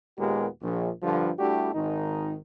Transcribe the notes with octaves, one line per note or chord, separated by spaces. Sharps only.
D#2 A#2 G#3 B3 G4 A#4
A#1
G2 D3 F3
G3 A3 D4 E4 F#4 G4
G#1 D#3 D#4